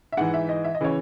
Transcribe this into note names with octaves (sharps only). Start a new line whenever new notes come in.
E5
G#2 E3 F#5
E5
D#5
E5
D#5
C#3 E3 C#5